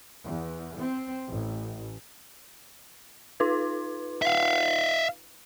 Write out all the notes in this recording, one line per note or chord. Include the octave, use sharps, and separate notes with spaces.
E2
C4
A1
D#4 F4 B4
E5 F5